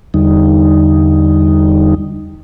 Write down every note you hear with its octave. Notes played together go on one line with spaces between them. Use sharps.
E2 D3 G3 D#4